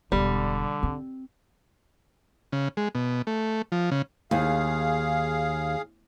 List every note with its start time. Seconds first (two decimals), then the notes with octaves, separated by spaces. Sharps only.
0.12 E1 D3 G3 B3
0.83 C4
2.52 C#3
2.77 G#3
2.95 B2
3.27 A3
3.72 F3
3.91 C#3
4.31 D#2 G#4 F5